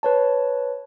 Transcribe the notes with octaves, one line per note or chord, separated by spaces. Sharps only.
B4 C#5 A5